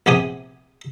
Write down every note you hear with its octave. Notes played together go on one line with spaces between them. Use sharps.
A#1 C3 B3 G4 G#5 D#6